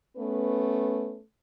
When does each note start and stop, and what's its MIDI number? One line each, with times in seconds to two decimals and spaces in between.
0.17 1.18 57
0.17 1.18 59
0.17 1.18 61
0.17 1.18 71